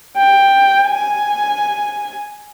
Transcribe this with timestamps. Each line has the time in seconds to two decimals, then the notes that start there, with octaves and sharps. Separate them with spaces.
0.17 G5
0.88 G#5